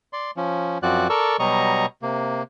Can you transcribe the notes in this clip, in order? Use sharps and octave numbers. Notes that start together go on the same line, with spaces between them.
D5 C6
F3 C#4
F#2 F3 C4 F#4 D5 F#6
A4 A#4 D5 C#6 E6
B2 F#3 G3 D#5 A#5 C#6
C3 A#3